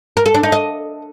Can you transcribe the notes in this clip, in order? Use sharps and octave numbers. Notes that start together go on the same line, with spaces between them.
A#4
A4
D4
D#4
D#5